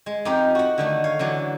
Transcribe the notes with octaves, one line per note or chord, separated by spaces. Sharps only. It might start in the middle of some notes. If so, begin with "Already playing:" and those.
G#3
F2 D#4 F4 G4 A#4 A#5
F#4 F#5
D3 D#3 A3
C#5 F5
D3 E3 F#3